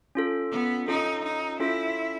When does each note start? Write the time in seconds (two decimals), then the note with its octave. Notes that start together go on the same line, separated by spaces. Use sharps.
0.15 C#4 F4 A4
0.52 B3
0.88 C#4 D#4 F4 A4
1.24 D#4
1.60 C#4 E4 F4 A4